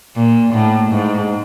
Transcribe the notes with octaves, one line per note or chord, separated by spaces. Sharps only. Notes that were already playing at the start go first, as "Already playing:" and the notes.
A#2
A2
G#2